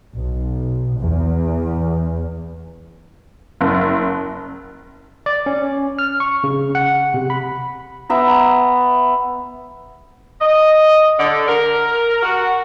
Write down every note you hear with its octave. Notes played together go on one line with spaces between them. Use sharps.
B1
E2
F#1
D5
C#4
F6
C#6
C#3
F#5
C3
B5
B3 E5 A#5
D#5
D3
A#4
F#4